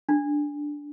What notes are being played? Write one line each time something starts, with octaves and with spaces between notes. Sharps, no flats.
D4